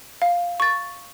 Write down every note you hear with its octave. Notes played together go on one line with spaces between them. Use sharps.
F5
C#6 A6